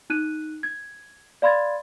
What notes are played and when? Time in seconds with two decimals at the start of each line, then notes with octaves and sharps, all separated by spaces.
0.10 D#4 F#6 D#7
0.63 G#6
1.42 D5 F5 B5 C6 G#6 A6